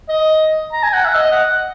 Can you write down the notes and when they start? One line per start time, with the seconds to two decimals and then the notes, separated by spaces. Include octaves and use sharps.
0.09 D#5
0.73 A#5
0.83 G#5
0.93 F#5
1.05 E5
1.15 D#5
1.32 F#5